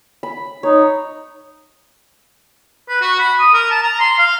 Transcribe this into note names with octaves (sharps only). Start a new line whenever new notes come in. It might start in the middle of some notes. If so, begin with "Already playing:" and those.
B5
D#4 C#5
B4
F#4
B5
D#6
A#4
A5
A#5
C6
F5